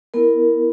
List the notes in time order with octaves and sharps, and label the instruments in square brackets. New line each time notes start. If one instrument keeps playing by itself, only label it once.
[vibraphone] B3 E4 A#4